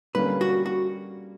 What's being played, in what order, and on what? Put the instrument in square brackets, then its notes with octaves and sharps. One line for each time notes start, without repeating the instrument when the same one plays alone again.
[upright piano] D3 G3 A#3 C#4 [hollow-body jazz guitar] B4
[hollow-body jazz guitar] F#4
F#4